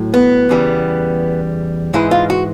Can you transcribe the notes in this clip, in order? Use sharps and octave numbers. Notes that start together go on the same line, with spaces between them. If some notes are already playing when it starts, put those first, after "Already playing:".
Already playing: A2 F#3
B3
E2 C#3 E3 G3
G#2 E3 G#3 E4
F4
F#4